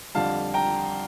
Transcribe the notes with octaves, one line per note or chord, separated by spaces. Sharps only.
F2 D3 G3 F5 A5
G5 A#5